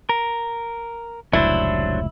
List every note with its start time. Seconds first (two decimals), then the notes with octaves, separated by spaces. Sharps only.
0.09 A#4
1.33 F1 C#2 A2 F#3 D4 E4 C5